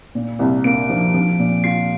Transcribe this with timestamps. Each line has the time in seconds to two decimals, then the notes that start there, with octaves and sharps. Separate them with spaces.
0.15 A#2
0.39 C2
0.64 A#3 D7
0.90 F3
1.14 F3
1.39 A#2
1.64 F4 C7